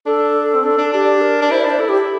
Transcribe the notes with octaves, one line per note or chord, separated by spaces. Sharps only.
D4 A4
C4
D4
D4
D4 G4
A#4
D4
E4 C5
D5
D4
C5
E4 A4
G4